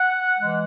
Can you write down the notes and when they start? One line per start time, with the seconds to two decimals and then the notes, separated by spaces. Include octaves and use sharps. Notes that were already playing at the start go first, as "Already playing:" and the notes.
Already playing: F#5
0.39 E3 G#3